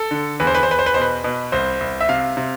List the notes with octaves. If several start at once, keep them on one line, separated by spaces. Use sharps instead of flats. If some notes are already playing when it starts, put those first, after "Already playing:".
Already playing: A4
D3
E2 B4
C5
B4
C5
E2 B4
C5
B4
B2 C5
B4
B2
C2 C5
C2
E5
C3 F5
C3